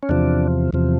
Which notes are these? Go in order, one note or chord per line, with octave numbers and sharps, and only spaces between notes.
C#4
E2 C3 F3 D4
E2 C3 F3